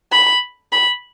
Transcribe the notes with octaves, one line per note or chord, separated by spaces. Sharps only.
B5
B5